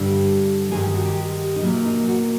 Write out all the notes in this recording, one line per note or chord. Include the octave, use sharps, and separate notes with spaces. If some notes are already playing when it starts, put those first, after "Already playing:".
Already playing: G2 D3 G3
G2 D#3 G#3 G#4
G4
F#4
G4
D#4
E2 B2 F#3 A#3 E4
D#4
F#4